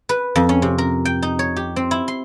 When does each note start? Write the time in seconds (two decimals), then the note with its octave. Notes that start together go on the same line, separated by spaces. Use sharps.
0.09 B4
0.36 F2
0.49 C#4
0.62 C3
0.78 A#4
1.05 G5
1.22 D#4
1.39 C#5
1.56 G4
1.76 C4
1.91 E4
2.08 C6